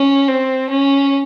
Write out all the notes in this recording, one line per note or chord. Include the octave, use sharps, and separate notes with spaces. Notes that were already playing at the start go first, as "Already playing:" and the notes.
Already playing: C#4
C4
C#4